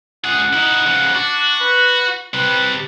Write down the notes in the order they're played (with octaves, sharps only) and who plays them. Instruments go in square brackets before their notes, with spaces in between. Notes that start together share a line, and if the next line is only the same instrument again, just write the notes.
[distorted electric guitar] C#2 G#4 [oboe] F#5
[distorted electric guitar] D#4 E4
C#3 F3
[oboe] D4 [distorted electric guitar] F#4
[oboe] B4
[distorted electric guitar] C3 G3 [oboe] B4